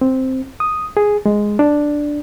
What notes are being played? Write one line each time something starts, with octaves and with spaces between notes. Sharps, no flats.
C4
D#6
G#4
G#3
D4